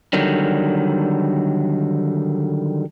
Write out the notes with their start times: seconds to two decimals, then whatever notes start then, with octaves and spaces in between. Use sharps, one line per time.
0.13 D3 D#3 F#3 G3